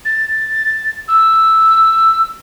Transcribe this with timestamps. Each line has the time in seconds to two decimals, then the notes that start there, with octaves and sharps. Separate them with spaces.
0.05 A6
1.08 E6